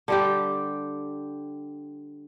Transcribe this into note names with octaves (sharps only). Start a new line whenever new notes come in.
D3 G3 G4